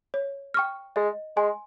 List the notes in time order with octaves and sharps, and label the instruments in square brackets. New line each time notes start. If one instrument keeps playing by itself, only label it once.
[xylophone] C#5
G5 C#6 F6
[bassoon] G#3 [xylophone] D#5
[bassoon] G#3 [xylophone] G#5 C6